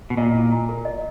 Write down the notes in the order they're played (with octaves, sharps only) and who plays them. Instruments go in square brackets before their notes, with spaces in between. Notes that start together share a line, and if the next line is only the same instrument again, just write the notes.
[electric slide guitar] B2
[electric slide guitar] A#2 [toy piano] D#5
[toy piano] E4
A#5
A#4
D#5